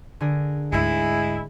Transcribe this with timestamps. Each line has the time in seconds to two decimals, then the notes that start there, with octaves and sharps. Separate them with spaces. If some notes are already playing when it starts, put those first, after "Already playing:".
0.21 D3 G#4 A#4
0.72 D2 G#2 G#3 E4